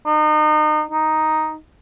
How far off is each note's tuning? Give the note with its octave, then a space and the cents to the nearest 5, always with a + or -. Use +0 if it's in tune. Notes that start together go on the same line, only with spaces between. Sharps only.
D#4 -30
D#4 +0